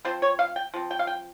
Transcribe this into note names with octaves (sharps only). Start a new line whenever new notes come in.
F3 C4 C5
C#5
F5
G5
F3 C4
G5
F5
G5